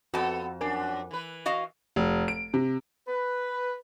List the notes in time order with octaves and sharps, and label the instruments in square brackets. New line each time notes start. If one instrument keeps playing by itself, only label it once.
[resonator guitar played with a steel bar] F2 A5 [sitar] B3 A4 [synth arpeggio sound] F#4
[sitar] F#2 D4 [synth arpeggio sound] A#4 G#5 D6
[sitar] E3 B4
[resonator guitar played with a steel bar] F#4 D#5 F5
[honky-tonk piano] F1
D7
C3
[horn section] B4